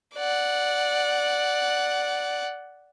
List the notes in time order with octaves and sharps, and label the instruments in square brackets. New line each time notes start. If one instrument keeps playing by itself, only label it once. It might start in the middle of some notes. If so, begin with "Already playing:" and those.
[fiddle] D5 F#5